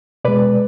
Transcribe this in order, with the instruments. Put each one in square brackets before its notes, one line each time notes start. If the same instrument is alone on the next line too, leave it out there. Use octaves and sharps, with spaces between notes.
[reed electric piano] B2 G#3 B4 D5